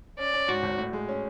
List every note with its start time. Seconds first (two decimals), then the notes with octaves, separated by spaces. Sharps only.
0.19 C#4 D5
0.33 C#4
0.48 G#2 F#4
0.63 G#1
0.79 A2
0.93 G#3
1.09 C#4